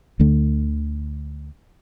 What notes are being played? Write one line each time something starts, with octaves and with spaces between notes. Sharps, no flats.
D2 D3 A3